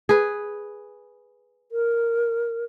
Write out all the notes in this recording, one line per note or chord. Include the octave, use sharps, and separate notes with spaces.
G#4 B4
A#4